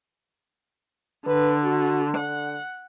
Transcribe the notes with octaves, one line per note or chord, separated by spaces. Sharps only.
D3 B4
F#4
D3 F#5